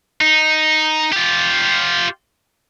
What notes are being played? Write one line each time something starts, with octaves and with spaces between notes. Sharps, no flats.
D#4
F4 G4